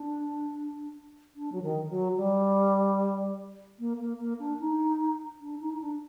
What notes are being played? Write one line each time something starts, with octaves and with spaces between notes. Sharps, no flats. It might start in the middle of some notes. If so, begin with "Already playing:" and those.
Already playing: D4
D4
F#3
D#3
F#3
G3
A#3
A#3
A#3
D4
D#4
D4
D#4
D#4
D4